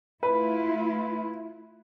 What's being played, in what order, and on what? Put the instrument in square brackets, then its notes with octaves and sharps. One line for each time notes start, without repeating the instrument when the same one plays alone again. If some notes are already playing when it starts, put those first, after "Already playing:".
[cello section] A3 E4 F4 [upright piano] B4